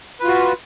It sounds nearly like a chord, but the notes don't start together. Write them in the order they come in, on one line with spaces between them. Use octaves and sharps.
B4 F4 F#4